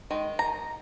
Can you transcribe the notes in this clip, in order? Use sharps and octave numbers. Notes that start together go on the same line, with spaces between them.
D#3 G#3
A#5